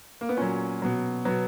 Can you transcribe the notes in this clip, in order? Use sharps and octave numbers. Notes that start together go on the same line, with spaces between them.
A#3
B3
A#2 F#3 C#4
B2 F#3
B2 F#3 B3